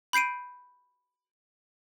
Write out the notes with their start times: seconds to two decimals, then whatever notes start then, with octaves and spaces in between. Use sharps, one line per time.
0.13 B5 G6 C7 D7 D#7